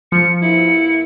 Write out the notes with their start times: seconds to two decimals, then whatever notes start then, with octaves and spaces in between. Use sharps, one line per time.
0.12 F3 C#7
0.42 G2 A#3 E4 C#7